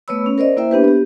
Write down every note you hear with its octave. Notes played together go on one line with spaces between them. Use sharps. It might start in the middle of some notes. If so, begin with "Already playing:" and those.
A3 B3 B4 C#5 B5 E6
C#4
A#4 C5 D5 D#5
A#3 E4 C5 E5 G5
B3 D4 G4 B4
B3 G4